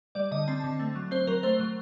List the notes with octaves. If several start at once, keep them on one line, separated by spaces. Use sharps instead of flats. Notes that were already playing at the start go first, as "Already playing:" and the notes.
G3 D5
D3 D#5
C4 A5
D3
A3
F#3
C4 C5
F#3 A#4
A3 C5
F#3